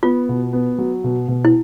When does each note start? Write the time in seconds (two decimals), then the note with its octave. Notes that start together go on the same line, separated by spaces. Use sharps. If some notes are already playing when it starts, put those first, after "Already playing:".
0.03 B3 F4
0.29 B2
0.53 B3
0.78 F#3
1.04 B2
1.28 B2
1.45 E4